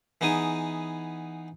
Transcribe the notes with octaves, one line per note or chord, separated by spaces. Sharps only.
E3 B3 D#4 G#4 D#6